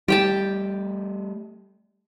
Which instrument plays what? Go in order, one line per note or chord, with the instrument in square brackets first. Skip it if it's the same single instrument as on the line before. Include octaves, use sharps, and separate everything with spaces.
[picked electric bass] G3 A3 [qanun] G4 G5 A5